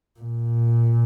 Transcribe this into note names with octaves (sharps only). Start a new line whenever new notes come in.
A#2